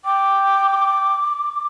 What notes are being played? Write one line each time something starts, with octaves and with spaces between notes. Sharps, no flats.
G5 D6